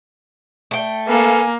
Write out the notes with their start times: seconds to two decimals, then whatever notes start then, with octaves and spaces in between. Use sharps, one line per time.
0.71 A3 G5
1.08 A#3 A4 B4 F5 G#5